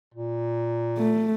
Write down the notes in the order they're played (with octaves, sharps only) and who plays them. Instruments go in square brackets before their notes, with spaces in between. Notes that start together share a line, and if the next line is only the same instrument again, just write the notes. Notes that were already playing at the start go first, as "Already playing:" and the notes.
[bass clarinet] A#2
[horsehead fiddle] A3